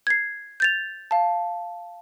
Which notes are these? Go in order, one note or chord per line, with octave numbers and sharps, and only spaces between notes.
G#6 C7
G6 A6 F7
F5 A5